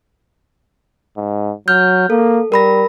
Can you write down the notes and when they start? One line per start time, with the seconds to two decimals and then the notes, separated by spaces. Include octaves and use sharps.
1.17 G#2
1.68 F#3 F6 G6
2.10 A#3 A4
2.52 G3 A#4 B5 A#6